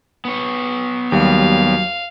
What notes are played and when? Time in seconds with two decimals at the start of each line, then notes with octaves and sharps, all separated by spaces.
0.25 B3 C#5
1.12 D#2 F#3 G3 F5